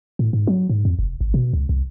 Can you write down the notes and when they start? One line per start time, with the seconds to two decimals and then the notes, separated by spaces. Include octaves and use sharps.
0.19 A2
0.33 G#2
0.47 F#3
0.69 G#2
0.85 F2
0.99 F1
1.21 G#1
1.34 B2
1.53 C#2
1.69 C2